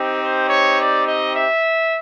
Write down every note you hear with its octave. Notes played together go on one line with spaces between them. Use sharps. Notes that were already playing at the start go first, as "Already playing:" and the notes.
Already playing: C4 D#4 G4
C5
C#5
D5
D#5
E5